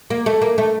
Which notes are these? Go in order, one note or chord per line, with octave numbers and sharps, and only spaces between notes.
A#3
A3
A#3
A3